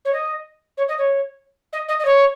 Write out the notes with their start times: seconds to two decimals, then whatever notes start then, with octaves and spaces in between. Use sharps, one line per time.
0.05 C#5
0.13 D#5
0.77 C#5
0.88 D#5
0.98 C#5
1.72 D#5
1.88 D#5
1.99 D#5
2.05 C#5